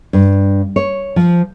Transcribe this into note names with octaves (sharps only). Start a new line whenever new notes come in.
G2
C#5
F3